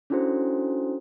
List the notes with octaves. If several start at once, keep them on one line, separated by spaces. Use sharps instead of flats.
C#4 D4 E4 F#4 A4 C5